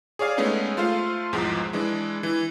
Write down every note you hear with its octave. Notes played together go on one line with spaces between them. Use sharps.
G#4 C#5 D5 F5 G#5
G#3 A3 B3 C#4 D#4 G#4
A3 F4 C5 F5
B1 E2 G#2 F3 G#3
E3 G#3 D4
E3